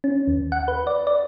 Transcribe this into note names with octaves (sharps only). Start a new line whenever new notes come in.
C#4
D#2
F#5
B4
D5
D5